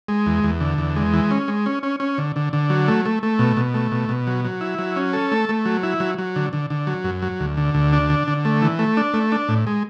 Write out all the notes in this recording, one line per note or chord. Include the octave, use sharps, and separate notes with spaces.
G#3
E2
E2
D3
E2
G#3
E3
C#4
G#3
C#4
C#4
C#4
D3
D3
D3
F#3
A3
A3
A3
B2
B2
A3
B2
B2
F#3
F#3
E4
F#3
C#4
A4
A3
A3
F#3
E4
F#3
F#3
D3
D3
D3
F#3
F#2
F#3
D2
D3
D2
D4
D3
D3
A3
E3
A3
D4
A3
D4
A2
G#3